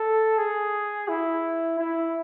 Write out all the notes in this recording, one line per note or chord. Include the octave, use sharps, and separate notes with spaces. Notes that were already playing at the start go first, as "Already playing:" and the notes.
Already playing: A4
G#4
E4
E4